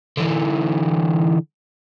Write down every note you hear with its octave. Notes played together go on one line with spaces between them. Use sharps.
D3 E3